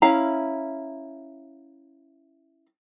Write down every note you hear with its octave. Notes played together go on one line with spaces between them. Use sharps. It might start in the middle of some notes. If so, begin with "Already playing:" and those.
C#4 E4 F5 A#5